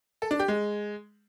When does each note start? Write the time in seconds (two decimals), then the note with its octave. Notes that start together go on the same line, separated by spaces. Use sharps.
0.22 A4
0.31 D4
0.40 G4
0.48 G#3